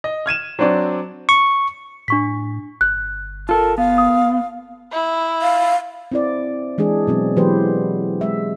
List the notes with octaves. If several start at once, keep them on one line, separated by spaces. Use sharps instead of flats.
D#5
F6 G#6 D#7 E7
F#3 C4 D4 D5
C#6
A2 D4 C#6 B6
G1 F#6
F4 A4 A#4 A5
B3 F5
D#6
E4
F5
C4 E4 D5
E3 G#3 D4 G#4
B2 F#3 C4
E3 F#3 G#3 G4 B4 C5
G#3 E5